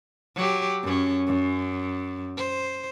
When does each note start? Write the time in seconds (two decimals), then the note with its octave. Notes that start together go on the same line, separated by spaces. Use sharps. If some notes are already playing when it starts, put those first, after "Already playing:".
0.36 F#3 G4
0.83 F#2 C#4
1.27 F#2
2.37 C5